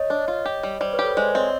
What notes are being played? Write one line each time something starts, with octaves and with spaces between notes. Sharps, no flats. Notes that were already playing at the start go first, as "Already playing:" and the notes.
Already playing: C#5 D#5
D4
F4
G4
G3
G3 C5 D5
B4 C#5
G4
A4 B4
G#3 C5 D5
C4 C#5 D#5